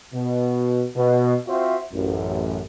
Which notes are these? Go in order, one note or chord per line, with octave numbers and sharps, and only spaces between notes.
B2
B2
C4 F4 F#4 C5 E5
A1 F#2